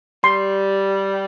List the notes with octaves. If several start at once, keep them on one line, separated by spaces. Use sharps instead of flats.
G3 C6